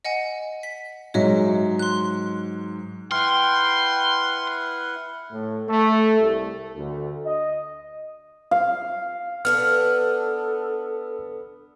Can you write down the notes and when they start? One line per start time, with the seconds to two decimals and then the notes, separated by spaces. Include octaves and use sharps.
0.05 D#5 F#5 G#5
0.63 B6
1.14 G#2 F#3 C#5 D#5 E5
1.79 C6 F#6
3.12 E4 B4 F#5 G5 C6 F6
5.31 A2
5.69 A3
6.19 C2
6.76 D2
7.25 D#5
8.51 F5
9.45 B3 D4 A4 B4 F6